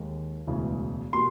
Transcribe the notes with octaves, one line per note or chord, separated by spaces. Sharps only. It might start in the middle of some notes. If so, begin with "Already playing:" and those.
Already playing: D#2 D#3 G#3
E1 D2 C#3 E3 G#3
B2 G3 A#3 C6